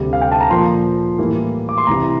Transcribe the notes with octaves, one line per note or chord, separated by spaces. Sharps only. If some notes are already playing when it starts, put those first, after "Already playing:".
Already playing: D2 C3 G3
F5
G5
A5
A#5
A#2 F3 A#3 C6
A2 E3 G3 A#3
D6
C6
C2 C3 E3 A#5